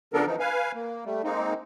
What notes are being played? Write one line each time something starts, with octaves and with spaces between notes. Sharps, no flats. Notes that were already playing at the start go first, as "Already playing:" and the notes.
C#3 F3 B3 D4 A4 A#4
E3 F3 D#4
B4 F5 G#5
A#3
G3 A3
G#3 A#3 C4 D#4